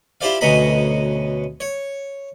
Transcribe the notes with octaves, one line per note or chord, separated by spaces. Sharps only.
E4 F4 G4 C5 D5 F5
D2 B2 C#4 D#5 A#5 B5
C#5